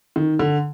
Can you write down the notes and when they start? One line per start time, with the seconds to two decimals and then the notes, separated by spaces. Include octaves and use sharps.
0.16 D#3
0.39 D3